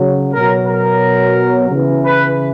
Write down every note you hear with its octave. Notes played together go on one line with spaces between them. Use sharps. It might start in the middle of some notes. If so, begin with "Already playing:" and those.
Already playing: C#3 F#3
B2 F#3 A#4
A#4
C#3 E3
B4